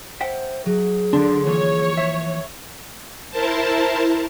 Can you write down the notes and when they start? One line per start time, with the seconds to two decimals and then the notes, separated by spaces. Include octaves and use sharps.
0.21 C5 E5 F#5 G5
0.66 F#3 G#4
1.13 D3 D4 C6
1.47 E3 F3 A#3 C#5
1.97 E5
3.31 E4 A#4 C5 A5